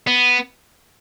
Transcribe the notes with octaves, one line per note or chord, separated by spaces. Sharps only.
B3